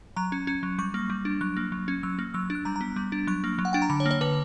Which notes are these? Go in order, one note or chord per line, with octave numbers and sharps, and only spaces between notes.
F#3 A#5
C#4
C#4
F#3
G3 C#6
A#3
G3
D4
F#3 F#6
A#3
F#3
C#4
F#3 E6
A#3
F#3 E6
D4
F#6
G3 A#5
A#5
B3
G3
D4
F#3 C#6
A#3
F#3
F#5
D4 G5
A#5
D3 B5
C#5
A#3
C#5
D3 B4